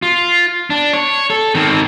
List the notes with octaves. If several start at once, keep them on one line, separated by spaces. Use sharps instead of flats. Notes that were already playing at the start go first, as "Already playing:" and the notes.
F4
D4
C#5
A4
D#3 C4